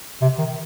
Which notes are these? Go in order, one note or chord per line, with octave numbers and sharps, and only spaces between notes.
C3
D#3